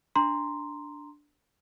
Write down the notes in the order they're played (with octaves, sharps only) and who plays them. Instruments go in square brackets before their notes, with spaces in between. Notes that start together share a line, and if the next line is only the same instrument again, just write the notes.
[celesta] D4 A#5 C6